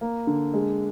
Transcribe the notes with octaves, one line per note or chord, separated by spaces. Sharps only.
A#3
D3
G#3